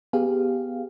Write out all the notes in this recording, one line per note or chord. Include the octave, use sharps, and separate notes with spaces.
B3 G4 G#4 F5